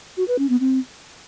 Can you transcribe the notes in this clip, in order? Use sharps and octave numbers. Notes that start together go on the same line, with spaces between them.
F#4
B4
C#4
B3
C4